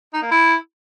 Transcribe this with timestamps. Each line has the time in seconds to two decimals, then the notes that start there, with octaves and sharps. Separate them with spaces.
0.14 D#4
0.22 A#3
0.31 E4